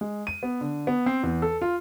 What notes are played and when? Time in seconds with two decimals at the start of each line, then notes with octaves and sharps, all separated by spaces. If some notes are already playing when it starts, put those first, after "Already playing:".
0.01 G#3
0.27 D#7
0.43 B3
0.61 D3
0.87 B3
1.06 C4
1.23 E2
1.42 A4
1.62 F4